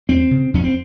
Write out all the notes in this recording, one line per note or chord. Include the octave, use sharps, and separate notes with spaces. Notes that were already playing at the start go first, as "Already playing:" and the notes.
E2 C4
C#3
F2 C#4
C4